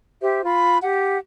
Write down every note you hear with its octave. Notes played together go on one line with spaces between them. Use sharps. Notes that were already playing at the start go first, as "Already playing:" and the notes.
G4 C5 E5
F4 B5
G4 F#5